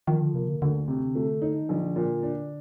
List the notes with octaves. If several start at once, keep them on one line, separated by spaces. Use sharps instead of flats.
D#3 F3
D3
C3 A#3
D3
D2 D3
C3
A3
D#4
D#3
A#1 D3
A#2
D4